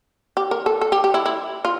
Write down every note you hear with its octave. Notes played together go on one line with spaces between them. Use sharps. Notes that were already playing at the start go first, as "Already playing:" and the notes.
G4
A#4
A4
A4
G4
G4
E4
E4
F4